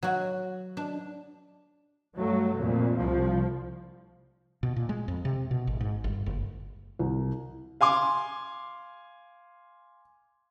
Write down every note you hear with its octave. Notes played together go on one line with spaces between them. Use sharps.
F#3 F#4
D4
G2 F#3 A3
F2 A#2
C2 F3
B2
A#2
G#3
F2
C3
B2
G#1
G#2
G1
F#1
C2
F5 G#5 C6 D6